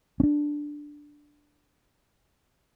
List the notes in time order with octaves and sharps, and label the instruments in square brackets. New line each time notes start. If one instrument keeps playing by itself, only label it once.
[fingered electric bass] C#4 D4